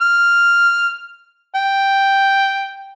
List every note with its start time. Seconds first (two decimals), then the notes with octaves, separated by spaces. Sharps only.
0.02 F6
1.55 G5